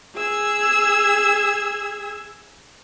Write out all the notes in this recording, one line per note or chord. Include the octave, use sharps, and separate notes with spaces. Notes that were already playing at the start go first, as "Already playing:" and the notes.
G#4 E6 G#6